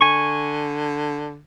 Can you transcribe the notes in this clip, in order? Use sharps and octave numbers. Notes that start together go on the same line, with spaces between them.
D3 G#5 C#6